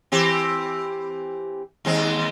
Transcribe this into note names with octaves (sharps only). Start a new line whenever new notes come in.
E3 C4 G4
D#2 G#3 C4